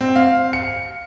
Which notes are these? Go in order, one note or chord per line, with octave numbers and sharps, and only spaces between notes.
C4
F5
C#7